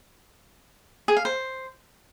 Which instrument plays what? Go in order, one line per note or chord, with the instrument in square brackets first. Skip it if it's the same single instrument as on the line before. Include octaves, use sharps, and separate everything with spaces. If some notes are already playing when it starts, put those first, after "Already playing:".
[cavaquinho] G#4
F5
C5